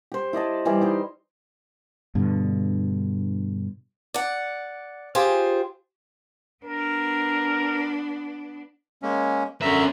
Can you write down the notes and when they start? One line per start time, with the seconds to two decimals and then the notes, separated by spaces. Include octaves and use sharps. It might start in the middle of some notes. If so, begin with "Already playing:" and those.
0.12 G4 C5
0.33 E4 D5 D#5 A5
0.65 E3 G3 E4 D5
0.81 D#4 G4 C6
2.15 G2 B2 D3
4.14 D5 F#5
5.15 F4 G4 G#4 C5
6.64 B3 D4 A#4
9.03 G#3 A#3 C#4
9.62 F#2 D3 C#4 E5 A#5